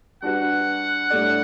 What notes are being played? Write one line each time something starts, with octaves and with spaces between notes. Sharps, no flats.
G3 D4 F#4 B4 F#5
A2 G3 D4 A4 D5